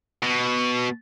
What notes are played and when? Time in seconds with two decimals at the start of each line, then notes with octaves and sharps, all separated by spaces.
0.22 B2